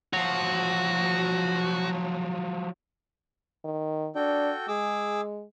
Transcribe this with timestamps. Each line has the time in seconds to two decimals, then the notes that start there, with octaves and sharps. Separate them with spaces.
0.13 F3 F#3 F#4
3.64 D#3
4.15 D4 F#4 A4 G5
4.68 G#3 G#4 D6 E6